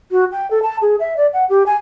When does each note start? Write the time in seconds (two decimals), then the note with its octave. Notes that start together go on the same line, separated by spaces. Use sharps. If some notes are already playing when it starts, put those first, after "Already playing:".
0.11 F#4
0.32 G5
0.51 A4
0.62 A5
0.82 G#4
1.00 E5
1.17 D5
1.33 F#5
1.50 G4
1.66 G#5